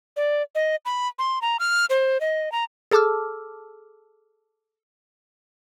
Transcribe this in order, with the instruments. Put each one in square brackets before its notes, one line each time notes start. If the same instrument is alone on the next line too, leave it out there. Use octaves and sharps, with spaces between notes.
[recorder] D5
D#5
B5
C6
A#5
F6
C5
D#5
A#5
[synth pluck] G#4 A4 A5 D6 E6 F6